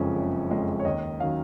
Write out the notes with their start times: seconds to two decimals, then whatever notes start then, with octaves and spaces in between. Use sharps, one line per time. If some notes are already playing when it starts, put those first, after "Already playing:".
Already playing: F#1 F2 F3 G#3 C#4
0.15 F#1
0.51 F2 F3 G#3 C#4
0.79 C#5
0.85 D#2 D#5
1.20 D#3 F#3 C#4 F5